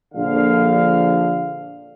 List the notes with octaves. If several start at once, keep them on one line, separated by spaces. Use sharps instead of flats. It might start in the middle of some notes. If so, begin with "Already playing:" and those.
A#1 D3 F5